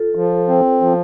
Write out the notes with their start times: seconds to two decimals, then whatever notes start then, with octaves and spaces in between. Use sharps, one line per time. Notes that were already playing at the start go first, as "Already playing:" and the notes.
Already playing: F4 A4
0.15 F3
0.48 C4
0.81 F3